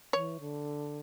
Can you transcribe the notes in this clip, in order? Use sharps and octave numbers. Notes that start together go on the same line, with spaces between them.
E3 C#5
D3